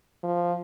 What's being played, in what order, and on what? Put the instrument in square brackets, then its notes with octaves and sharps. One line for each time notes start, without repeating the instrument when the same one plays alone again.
[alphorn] F3